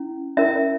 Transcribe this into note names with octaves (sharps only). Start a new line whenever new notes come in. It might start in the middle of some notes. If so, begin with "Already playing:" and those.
Already playing: C#4 E4
C#4 E4 A#4 E5